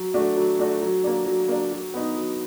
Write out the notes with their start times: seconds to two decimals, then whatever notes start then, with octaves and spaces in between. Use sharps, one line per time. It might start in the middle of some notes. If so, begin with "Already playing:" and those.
Already playing: F#3
0.14 A3 D4 F#4
0.36 F#3
0.59 A3 D4 F#4
0.81 F#3
1.04 A#3 D4
1.25 F#3
1.49 A#3 D4
1.71 F#3
1.94 B3 D#4
2.16 F#3